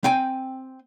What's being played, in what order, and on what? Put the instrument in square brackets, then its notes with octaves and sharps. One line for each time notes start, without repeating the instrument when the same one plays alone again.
[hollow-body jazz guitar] C4 G5 G#5